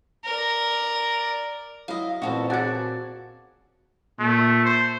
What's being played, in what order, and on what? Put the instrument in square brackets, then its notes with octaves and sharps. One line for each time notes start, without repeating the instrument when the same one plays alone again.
[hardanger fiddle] A#4 D5
[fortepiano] F#3 E4 [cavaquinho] D#5 F5
[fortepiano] A1 E4 B4 [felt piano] A#2 C4 [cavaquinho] F#4 G4 A4
[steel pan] F#4 F#5 A5 [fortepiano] G#4 [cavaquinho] G#5 D6
[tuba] A#2 [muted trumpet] A3
[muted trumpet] C5